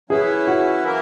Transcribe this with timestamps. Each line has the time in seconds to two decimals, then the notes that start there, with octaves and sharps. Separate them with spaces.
0.10 F#3 C#4 E4 G#4 B4 E5
0.47 F#4
0.83 E3 A#3 E4 A#4